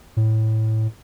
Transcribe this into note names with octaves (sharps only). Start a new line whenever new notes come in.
A2